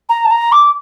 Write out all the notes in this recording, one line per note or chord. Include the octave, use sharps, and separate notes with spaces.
A#5
A5
A#5
D6